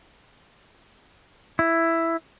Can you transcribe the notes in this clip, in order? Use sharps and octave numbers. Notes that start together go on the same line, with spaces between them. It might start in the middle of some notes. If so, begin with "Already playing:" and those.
E4